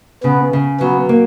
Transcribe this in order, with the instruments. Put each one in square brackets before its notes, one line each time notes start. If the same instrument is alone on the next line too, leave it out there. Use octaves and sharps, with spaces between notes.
[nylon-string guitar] C#3 [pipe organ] B3
[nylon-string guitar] C#3
[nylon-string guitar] F#3 [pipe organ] B3
[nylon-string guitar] A#3